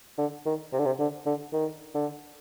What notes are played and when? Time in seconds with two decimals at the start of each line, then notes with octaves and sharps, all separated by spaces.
0.18 D3
0.46 D#3
0.73 C3
0.79 D3
0.86 C3
0.99 D3
1.26 D3
1.53 D#3
1.95 D3